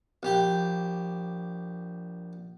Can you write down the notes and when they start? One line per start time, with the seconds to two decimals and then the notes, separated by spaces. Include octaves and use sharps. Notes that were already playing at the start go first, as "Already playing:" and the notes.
0.23 A#1 G4 G5